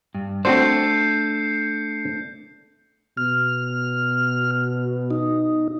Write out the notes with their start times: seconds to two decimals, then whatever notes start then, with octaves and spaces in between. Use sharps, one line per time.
0.15 G2
0.45 A3 C4 D4 F#4 C5 G6 C7 C#7
3.17 B2 F6
5.11 D#4